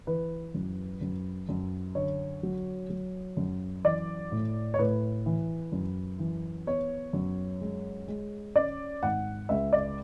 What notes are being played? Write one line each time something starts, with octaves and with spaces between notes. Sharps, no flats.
E3 B4
F#2
F#2
F#2
D3 C#5
F#3
F#3
F#2
E3 D5
A2
C#5
A2 B4
E3
F#2
E3
B3 C#5
F#2
G#3
G#3
C#4 D5
G#1 F#5
C#2 E5
D5